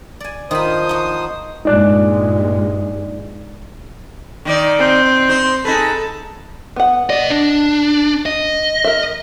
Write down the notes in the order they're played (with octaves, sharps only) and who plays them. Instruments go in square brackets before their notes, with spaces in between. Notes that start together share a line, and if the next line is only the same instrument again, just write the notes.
[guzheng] D5 G#5
[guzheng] D#3 A#4 B5 [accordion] F3 C5 D#6
[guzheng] D#4 F#4
[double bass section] G2 A#2 G#3 [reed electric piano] D#4 D5 F#6
[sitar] D#3 D#4 D5
[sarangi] C4
[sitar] D#4 C5
[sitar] D#4 G#4 B4 [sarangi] A4
[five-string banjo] B3 F#5
[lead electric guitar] B4 D#5 [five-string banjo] D5
[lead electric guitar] D4
D#5
[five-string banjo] A#4 E5